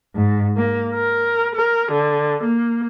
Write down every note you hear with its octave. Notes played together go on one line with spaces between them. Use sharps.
G#2
A#3
A#4
A#4
D3
A#3